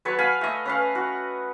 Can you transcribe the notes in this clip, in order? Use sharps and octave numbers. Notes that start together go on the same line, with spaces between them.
F#3 B4 C#5 A5
F5 G#5 B5
A3 D#5
C#4 B4 F5
F#4